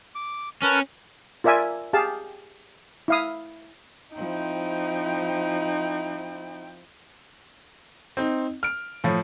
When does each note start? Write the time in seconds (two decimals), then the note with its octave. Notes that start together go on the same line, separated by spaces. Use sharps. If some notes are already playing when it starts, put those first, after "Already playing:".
0.15 D6
0.63 C#4 A#4 B4 A5
1.44 F4 A#4 D5 E5 G#5
1.93 G4 G#4 F5 A5
3.08 E4 F5 D#6
4.16 F3 C4 D#4 E4 G5
8.17 C4 D#4
8.63 F6 D7
9.04 A2 F3